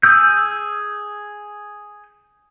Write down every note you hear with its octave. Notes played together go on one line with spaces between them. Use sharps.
G#4 D#6 E6 G6